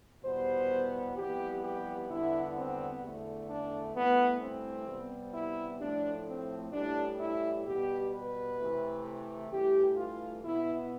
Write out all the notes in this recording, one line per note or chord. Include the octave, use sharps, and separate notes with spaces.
E2 B2 G3 B3 C5
F2 E3 G3 B3 G4
G4
E2 D3 G3 B3 E4
C4
E2 D3 A3
D4
G2 E3 A3 B3
C4
C3 G3 B3
E4
A2 F3 A3 D4
C4
A2 E3 G3 D4
E4
B2 G3 B3 G4
B4
C3 E3 A3
G2 E3 A3 G4
F4
B2 B3 E4